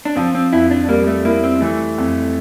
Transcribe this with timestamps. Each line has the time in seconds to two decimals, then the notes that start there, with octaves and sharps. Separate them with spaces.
0.05 D4
0.16 F3 C4
0.35 C4
0.53 F2 E4
0.71 D4
0.89 G3 A#3
1.07 A3
1.25 A#3 E4
1.44 C4
1.61 E3 A3
1.98 F2